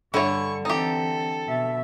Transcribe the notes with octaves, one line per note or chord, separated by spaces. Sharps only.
G2 D3 E3 E4 C#5 C#6
E3 C4 D#4 G4 A4
B2 E5